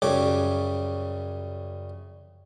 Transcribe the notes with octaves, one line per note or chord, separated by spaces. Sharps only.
F#2 C#3 G3 C#5 D6